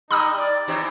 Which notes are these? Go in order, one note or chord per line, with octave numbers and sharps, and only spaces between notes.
G3 D#4 B5 D#6 E6
D5
E3 C4 D#4 G4 C#5